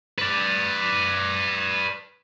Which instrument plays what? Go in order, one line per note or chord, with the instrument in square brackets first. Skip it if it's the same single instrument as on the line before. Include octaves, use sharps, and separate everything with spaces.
[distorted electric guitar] B4 D5